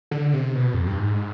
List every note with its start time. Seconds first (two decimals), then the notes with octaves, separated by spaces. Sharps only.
0.11 D3
0.34 C3
0.55 B2
0.74 F2
0.87 G2
0.99 G#2